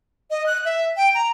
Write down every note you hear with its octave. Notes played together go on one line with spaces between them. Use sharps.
D#5
F#6
E5
G5
A#5